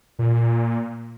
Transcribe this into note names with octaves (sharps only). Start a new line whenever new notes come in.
A#2